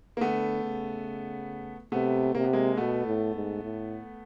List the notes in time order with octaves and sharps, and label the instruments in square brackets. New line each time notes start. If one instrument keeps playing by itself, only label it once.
[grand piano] A#3
[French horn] D3 [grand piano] A3 B3
[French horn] C#3
[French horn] C3 [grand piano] A3 B3
[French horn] C3 [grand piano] A#3
[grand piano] B3
G#3 A#3
[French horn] B2 [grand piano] A3 B3
[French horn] A2
G#2
A2